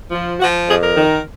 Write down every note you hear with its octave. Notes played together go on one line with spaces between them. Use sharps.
F3
F3 F#4
F2 G#4
A#4
D#3